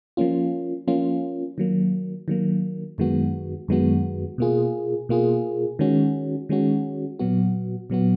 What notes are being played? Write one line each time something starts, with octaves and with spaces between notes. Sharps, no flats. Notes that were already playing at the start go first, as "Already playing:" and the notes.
F3 A#3 C#4 F4
F3 A#3 C#4 F4
D#3 F#3 A#3
D#3 F#3 A#3
F#2 D#3 G#3 B3 F#4
F#2 D#3 G#3 B3 F#4
B2 A#3 F4 G#4
B2 A#3 F4 G#4
D#3 G#3 C#4 F#4
D#3 G#3 C#4 F#4
A#2 F#3 B3 F#4
A#2 F#3 B3 F#4